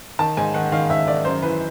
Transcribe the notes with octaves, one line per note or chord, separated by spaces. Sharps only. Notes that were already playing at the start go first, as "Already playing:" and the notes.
D#3 A5
G#2 G#5
D#3 F#5
D#3 F5
G#2 E5
D#3 D5
F#2 C5
E3 B4